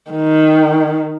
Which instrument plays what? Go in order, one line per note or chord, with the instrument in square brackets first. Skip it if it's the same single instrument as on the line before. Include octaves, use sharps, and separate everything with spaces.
[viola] D#3